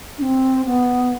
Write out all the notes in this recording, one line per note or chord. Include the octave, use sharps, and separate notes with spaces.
D4
C4
B3